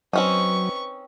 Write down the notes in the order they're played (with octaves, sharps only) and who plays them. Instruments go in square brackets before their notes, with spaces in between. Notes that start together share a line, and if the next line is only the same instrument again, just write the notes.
[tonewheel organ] F#3 [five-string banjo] C4 C#4 D#4 [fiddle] B4 C#6